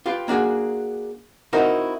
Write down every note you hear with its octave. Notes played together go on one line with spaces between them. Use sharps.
F4 G4 B4
A#3 D4 F#4 G#4
C4 D#4 E4 F#4 A#4 C5